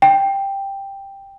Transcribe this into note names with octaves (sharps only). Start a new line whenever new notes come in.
G5